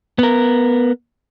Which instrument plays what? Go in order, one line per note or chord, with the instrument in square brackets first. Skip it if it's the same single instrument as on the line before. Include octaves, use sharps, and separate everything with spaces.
[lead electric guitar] B3 A#4